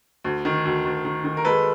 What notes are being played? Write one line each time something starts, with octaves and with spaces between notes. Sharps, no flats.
D2
D#3
D2
D2
D#3
D#3
A#4
G#3 A4 B4